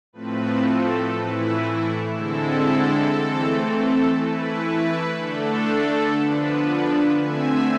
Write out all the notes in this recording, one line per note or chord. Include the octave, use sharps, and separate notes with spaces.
A2 F3 A3 C4 B4
A4
A2 E3 A3 E4 B4
D3 G#3 C4 E4 A4
E3 A3 C4
A4
E3 A3 E4 B4
B4
D3 A3 D4 A4
D3 F3 B3 D4 B4
D3 A3 C4 E5 G#5